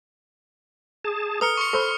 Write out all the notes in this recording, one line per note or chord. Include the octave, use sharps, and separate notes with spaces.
G#4 A5
A4 B4 A#5 D#6 F6 C#7
C6 C#6 C#7
A4 C5 B5